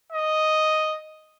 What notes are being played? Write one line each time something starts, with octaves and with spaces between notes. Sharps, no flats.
D#5